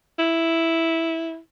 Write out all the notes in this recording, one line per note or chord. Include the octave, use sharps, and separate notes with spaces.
E4